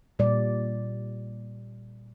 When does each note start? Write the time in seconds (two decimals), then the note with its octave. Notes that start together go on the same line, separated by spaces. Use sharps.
0.19 A#2 G3 D5